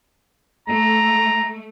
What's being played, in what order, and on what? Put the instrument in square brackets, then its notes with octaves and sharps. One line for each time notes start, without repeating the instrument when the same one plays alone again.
[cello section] A3 [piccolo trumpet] A#5